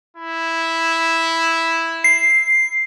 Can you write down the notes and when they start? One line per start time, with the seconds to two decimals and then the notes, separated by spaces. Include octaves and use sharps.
0.17 E4
2.04 C7